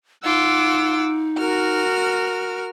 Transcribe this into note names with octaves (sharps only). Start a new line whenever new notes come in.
D#4 F4 F#5 D6 E6
F#4 A#4 F6